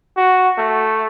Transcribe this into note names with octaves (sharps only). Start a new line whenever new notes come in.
F#4
A3